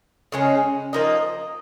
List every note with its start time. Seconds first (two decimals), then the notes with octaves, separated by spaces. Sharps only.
0.32 C#3 G#3 C#4
0.93 F3 A#3 D#4 D#5